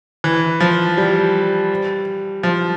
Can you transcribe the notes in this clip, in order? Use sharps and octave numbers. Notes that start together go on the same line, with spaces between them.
E3
F3
G3
F3